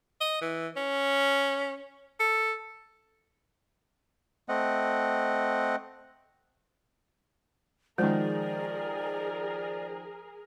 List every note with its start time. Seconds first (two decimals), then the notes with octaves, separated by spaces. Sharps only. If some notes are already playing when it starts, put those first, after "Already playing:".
0.21 D#5
0.41 E3
0.77 C#4
2.20 A4
4.49 A3 C4 D#5 F#5
7.98 D#3 F3 G#3 G#4 A#4 D5